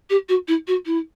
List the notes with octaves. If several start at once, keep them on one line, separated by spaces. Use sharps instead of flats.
G4
F#4
E4
F#4
E4